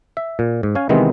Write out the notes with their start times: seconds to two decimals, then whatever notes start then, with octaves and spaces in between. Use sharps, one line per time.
0.17 E5
0.39 A#2
0.63 G#2
0.75 C#4 F5 G#5
0.89 C3 D#3 E3 G#3 B3 C4